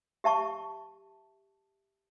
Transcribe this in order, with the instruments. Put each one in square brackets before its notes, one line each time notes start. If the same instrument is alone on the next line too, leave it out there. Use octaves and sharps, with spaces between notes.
[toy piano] G4 E5 A5 C#6